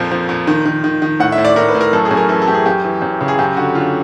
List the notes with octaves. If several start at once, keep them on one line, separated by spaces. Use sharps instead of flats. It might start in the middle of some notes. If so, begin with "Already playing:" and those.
Already playing: F2 A#2 F3
F3
A#2
D#3
D#3
D#3
D#3
A2 F#5
E5
A2
D5
A2 A#4
B4
A2
A#4
F#2 A4
G#4
F#2
A#4
E3 A4
A4
F#2 G4
G#4
F#2 G4
E3
F#2
C#3
G#4
F#2 G4
D3 F#4
D3 F4